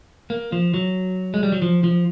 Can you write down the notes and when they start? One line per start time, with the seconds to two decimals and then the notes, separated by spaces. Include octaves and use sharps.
0.30 A#3
0.52 F3
0.74 F#3
1.34 G#3
1.43 G3
1.52 F#3
1.62 F3
1.84 F3